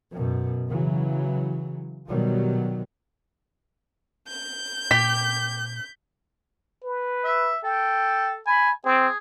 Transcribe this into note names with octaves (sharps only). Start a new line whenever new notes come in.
F#2 B2
C#3 E3 F#3
B2 D#3 F#3 G3
G6
A#2 G4 B6
B4
E5
A4 G5
G#5 B5
C4 G#4